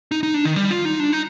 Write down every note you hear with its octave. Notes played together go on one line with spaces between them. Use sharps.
D#4
D#4
D4
D#3
G3
F4
D#4
D4
D#4